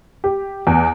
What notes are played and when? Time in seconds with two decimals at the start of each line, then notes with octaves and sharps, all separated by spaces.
0.24 G4
0.67 E2